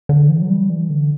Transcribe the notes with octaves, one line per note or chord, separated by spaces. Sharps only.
D3
E3
F#3
G3
E3
D3